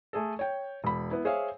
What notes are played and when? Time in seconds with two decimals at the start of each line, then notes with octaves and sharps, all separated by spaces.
0.13 A3 G#4 A4
0.39 C#5 G5
0.84 E1 B5
1.11 B3 E4
1.25 G#4 C5 C#5 E5 F5